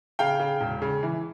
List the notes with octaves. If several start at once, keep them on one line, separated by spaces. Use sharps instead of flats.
C#3 F5 G5
C#3
E1
C#3
E3